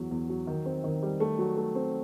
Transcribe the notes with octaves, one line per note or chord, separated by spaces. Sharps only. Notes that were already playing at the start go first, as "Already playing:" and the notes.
Already playing: E2 F#3
E2
F#3
D#3
C4
D#3
G3
A3
F#3
A3
C4